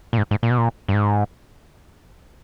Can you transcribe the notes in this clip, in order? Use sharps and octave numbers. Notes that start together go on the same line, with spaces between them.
A#2
G#2
G#2
A#2
B2
A#2
G2
G#2